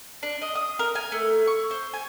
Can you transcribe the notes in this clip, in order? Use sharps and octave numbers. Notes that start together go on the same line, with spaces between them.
D4
D#5
D#6
A#4
G#5
A3
C#6
C5
G#5